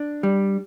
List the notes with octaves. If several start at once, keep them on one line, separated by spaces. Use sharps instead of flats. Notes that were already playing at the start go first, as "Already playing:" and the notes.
Already playing: D4
G3